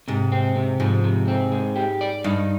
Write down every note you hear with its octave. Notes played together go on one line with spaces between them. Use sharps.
G#2 C3
C4
C3
G#2 F3
C3
C4
G#3
G4
D5
G2 D#4